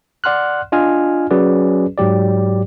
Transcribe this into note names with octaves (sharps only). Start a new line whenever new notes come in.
D5 F#5 C6 F6 F#6
D4 F4 D#5 G#5 F6
F#3 C#4 F#4 G#4 B4 D5
G#2 F#3 G4 D5